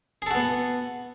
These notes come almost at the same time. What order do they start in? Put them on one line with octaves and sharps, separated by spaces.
G#4 A4 F#4 B3